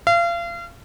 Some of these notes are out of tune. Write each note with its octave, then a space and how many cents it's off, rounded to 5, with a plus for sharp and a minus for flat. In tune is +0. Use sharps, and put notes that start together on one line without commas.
F5 -35